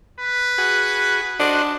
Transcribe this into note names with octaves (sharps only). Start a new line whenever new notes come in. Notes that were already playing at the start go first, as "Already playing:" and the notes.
B4
F#4 G#4
D4 F#4 C5 D#5